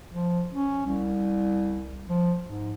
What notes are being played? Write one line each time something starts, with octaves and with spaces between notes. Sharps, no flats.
F3
C#4
C2
F3
G#2